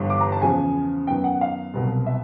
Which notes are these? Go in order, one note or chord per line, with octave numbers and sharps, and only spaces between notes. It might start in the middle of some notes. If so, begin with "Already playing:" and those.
Already playing: G1 G2 E3
D6
A#5
A5
E2 C#3 F3 G#5
F#2 D#3 F#3 B3 G5
F#5
F5
C2 B2 F#3
E5